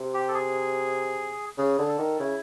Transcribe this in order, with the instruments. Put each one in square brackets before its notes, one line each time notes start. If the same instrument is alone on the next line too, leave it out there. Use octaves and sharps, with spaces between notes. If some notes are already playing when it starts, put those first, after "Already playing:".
Already playing: [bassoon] C3
[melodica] G4
A4
G#4
[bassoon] C#3 [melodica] G#4
[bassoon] D3
[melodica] A4
[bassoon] D#3
[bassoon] C#3 [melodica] E4